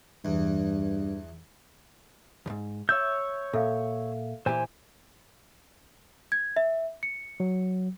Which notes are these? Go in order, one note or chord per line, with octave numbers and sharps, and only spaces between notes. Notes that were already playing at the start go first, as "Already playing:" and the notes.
E2 G2
E2 G#2
C#5 E5 E6 G6
A#2 A4 E5 F5
A#2 E3 G4 C5 G#5
G#6
E5
C#7
F#3